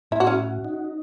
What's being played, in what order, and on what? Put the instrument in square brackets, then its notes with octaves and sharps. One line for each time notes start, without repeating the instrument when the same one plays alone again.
[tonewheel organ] A2 [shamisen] E4
[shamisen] F#4
C#4 E4
[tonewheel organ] F#4
D#4